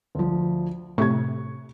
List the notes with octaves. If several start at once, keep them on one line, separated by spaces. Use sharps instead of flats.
D2 F3
A2 C3 C#6 G#6